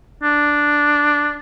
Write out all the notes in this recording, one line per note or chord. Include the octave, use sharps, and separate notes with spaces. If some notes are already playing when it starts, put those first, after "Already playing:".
D4